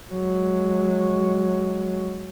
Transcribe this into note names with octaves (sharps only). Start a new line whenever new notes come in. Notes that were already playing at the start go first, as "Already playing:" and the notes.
F#3 G#3